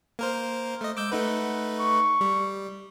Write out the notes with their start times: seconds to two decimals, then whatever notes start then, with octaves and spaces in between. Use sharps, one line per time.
0.19 A#3 A#4 C5
0.81 A3 D#5
0.97 G#3 D6 E6 G6
1.12 A3 D#4 B4 F#5
1.79 C#6
2.21 G3